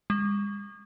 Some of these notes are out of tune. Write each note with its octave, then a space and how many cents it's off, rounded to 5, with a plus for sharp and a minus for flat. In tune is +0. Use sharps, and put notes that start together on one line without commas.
G#3 -40